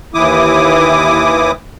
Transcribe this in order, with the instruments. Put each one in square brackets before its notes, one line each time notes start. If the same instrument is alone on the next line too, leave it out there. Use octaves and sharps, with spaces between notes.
[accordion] D#2 E3 E4 D6 D#6